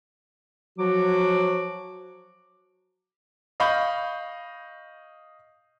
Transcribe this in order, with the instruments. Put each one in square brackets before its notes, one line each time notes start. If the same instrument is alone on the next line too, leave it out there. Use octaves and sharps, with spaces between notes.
[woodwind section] F3 F#3 F#4 D6
[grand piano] D#5 F5 B5 C#6 G6